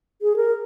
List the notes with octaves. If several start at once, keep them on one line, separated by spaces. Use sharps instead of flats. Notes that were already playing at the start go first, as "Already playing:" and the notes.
G#4
A#4